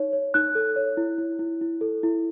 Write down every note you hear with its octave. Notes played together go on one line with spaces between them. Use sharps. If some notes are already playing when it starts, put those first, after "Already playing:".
Already playing: D#4 C#5
C#5
D#4 F#6
A4
C#5
E4
E4
E4
E4
A4
E4